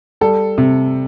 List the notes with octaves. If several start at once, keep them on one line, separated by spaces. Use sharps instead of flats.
G3 A4
C3